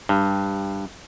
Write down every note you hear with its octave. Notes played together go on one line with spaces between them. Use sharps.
G2